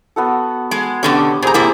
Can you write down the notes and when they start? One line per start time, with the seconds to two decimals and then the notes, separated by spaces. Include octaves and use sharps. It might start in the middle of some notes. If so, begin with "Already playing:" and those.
0.16 B3 F#4 A4
0.71 G#3
1.03 B2 D3 B3 C#4 G4
1.42 A#2 G4 G#4 C5 A#5
1.54 C3 A#3 E4